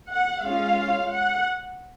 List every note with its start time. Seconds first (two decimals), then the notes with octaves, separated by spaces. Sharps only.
0.09 F#5
0.43 G#3 C#4 F4 F5
1.11 F#5